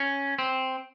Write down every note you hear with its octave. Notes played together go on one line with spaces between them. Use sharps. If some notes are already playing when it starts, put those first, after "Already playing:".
Already playing: C#4
C4